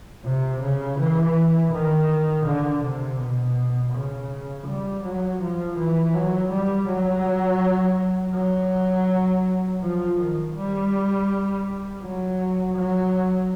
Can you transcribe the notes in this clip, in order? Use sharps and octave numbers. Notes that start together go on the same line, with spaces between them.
C3
C#3
E3
D#3
D3
C3
B2
C#3
G3
F#3
F3
E3
F#3
G3
F#3
F#3
F3
D#3
G3
F#3
F#3